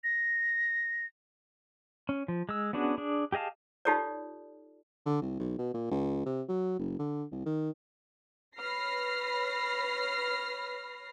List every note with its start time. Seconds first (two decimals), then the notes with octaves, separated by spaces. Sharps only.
0.04 A#6
2.09 C#4
2.28 F3
2.49 G#3 E6
2.73 B3 C#4 D4 F#4 G#4
2.98 D4 G#4
3.32 G4 G#4 D#5 F5 A5
3.85 D#4 F4 G4 A4 C#5 D5
5.06 D3
5.22 C2
5.39 B1
5.59 B2
5.74 A#2
5.91 C#2
6.26 C3
6.49 F#3
6.79 F#1
6.99 D3
7.32 C2
7.46 D#3
8.57 B4 C#5 B5 F6 A#6 C7